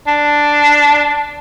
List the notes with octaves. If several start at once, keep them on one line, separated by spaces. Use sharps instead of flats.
D4